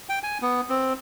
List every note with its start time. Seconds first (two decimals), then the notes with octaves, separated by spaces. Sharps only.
0.09 G5
0.23 G#5
0.42 B3
0.69 C4